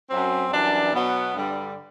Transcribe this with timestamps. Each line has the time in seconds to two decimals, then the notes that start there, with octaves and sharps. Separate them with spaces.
0.09 F#2 F#3 C4
0.51 F#2 E3 G3 D4
0.93 B2 F#3 B3
1.35 G2 D3 G3